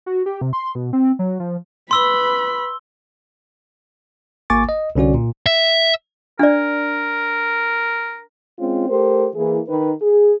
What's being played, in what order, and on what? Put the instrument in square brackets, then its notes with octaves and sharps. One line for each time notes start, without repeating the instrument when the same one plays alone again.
[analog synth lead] F#4
G4
C3
C6
B2
C4
F#3
F3
[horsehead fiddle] B4 B5 [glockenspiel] C6 E6 G7
[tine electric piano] G#1 A#3 G#5 C#6 D6 A6
D#5
C2 D3 C#4 F#4 D5
A#2
[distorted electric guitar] E5
[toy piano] D4 D5 [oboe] A#4
[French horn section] G#3 C4 C#4 F4
A3 G4 A#4 C5
E3 A#3 E4 G#4
D#3 B4
G#4